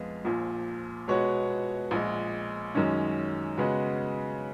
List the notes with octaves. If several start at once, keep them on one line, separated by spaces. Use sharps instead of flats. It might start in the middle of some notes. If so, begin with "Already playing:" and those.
Already playing: F2 F3 G#3 B3 F4
A#1 A#2 F3
B2 G#3 B3 F#4 C#5
A#1 A#2 G#3
F#2 D#3 G#3 C#4
C#3 G#3 B3 F#4